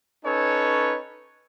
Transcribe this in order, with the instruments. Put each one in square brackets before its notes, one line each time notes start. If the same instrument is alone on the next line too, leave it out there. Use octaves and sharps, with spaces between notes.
[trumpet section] C#4 D#4 A4 B4 C#5